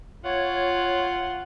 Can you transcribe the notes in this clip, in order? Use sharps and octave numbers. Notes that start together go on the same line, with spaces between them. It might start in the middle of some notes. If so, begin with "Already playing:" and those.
F4 C#5 F#5